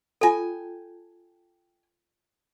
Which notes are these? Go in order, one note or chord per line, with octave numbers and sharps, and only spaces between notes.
F4 A4 G5 G#5